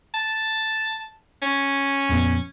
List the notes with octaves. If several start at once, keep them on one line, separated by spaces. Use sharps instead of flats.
A5
C#4
A#1 F2 B3